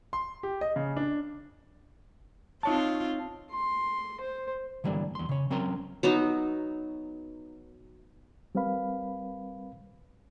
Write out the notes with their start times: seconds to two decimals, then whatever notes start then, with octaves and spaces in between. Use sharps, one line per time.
0.13 C6
0.43 G4
0.61 D#5
0.76 C#3
0.97 D4
2.63 C4 D#4 F4 C#5 A5
3.51 C6
4.20 C5
4.84 D3 E3 G3 A#3 D4
5.15 E2 C6
5.29 C#3 C#5
5.50 F#3 C4 C#4 A#4 A#5 C6
6.03 F#3 B3 D#4
8.55 G3 C4 A#4 B4 F5 B5